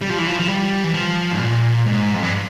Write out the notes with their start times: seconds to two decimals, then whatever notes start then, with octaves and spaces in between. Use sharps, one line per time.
0.01 G3
0.10 F3
0.18 E3
0.28 F3
0.40 F3
0.48 G3
0.84 E3
0.94 F3
1.32 G#2
1.40 A#2
1.86 G#2
2.14 F2
2.22 G2